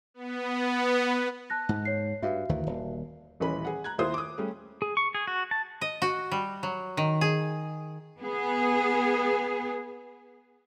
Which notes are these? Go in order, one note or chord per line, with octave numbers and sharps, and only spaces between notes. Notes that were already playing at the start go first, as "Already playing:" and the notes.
B3
A5 F#6 A#6
G#2
C#5 C7
G2 F#4 E5 F5
D2 D#3 E3
D#1
D#1 A1 E3 C#4 B4 B5
G#4 F#5
A#5 F#6 G#6
D#2 E4 F4 C5 D#6
D6 D#6
G3 A3 C#4 G#4
G#4
C#6
G#4
F#4
A5
D#5
F#4
G3
F#3
D#3
G#4
B3 G#4